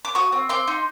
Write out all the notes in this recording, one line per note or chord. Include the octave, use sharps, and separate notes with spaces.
D6
F#4 C#6 D#6
C4
C4 C6 D6
D#4